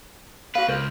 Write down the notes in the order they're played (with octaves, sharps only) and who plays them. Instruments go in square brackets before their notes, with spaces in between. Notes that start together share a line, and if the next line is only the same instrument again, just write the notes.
[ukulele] F#4 F5 [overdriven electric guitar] B4
[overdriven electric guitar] C#2 [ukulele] A#4 C5